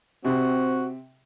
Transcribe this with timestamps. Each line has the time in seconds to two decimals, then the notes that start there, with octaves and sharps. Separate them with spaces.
0.25 C3 C4 F#4